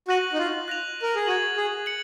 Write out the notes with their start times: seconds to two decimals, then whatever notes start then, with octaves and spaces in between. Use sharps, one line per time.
0.08 F#4 F#6 A#6 D#7 F#7
0.33 D#4
0.39 F4
0.68 F#6 A#6 F7
1.02 A#4
1.15 G#4
1.26 F#4 G#6 D#7 F#7
1.57 G#4
1.86 C#7 F#7